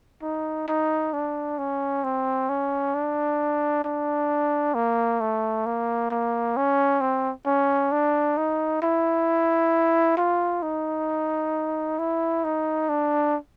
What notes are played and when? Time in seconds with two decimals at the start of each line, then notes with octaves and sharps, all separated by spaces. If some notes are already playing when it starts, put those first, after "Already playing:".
0.22 D#4
0.68 D#4
1.13 D4
1.58 C#4
2.04 C4
2.49 C#4
2.95 D4
3.84 D4
4.75 A#3
5.21 A3
5.66 A#3
6.11 A#3
6.57 C#4
7.01 C4
7.46 C#4
7.92 D4
8.38 D#4
8.82 E4
10.17 F4
10.63 D#4
11.99 E4
12.44 D#4
12.89 D4